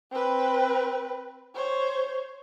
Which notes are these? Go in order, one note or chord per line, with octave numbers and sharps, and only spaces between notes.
C4 B4
C5 C#5